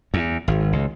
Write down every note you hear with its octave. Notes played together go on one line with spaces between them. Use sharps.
E2
G#1
C#2